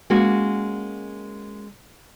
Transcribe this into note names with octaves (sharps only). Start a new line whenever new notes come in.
G#3 A#3 C#4 F#4